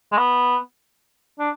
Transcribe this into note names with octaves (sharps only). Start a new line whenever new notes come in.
G#3
B3
D4